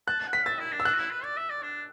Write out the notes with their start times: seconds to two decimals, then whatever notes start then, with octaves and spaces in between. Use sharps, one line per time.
0.08 A5 F#6
0.20 A5
0.27 F#5
0.33 B6
0.46 E5 A6
0.59 E4
0.72 D4
0.80 E6
0.85 D4 F#6
0.94 F#4
0.98 E4
1.11 B4
1.24 D5
1.37 E5
1.50 D5
1.63 D4